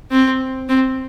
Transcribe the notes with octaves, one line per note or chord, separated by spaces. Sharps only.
C4
C4